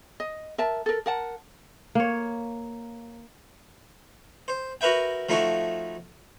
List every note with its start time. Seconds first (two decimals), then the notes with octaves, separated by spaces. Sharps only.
0.20 D#5
0.58 A#4 E5 A5
0.86 A4 A#4
1.06 A#4 F#5 A5
1.95 A#3 C#5
4.48 C5
4.81 F#4 A#4 B4 E5 G5
5.29 F3 A3 D#4 E4 F#4